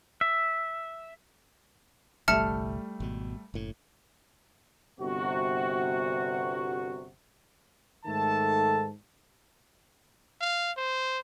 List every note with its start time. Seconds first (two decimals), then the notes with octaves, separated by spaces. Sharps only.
0.21 E5
2.28 G1 C2 G3 A3 E5 A5 F6 C#7
3.00 G#1 B2
3.54 F#1 A2
4.99 G1 C3 F#4
8.06 G#2 D#3 A3 A4 A5
10.41 F5
10.77 C5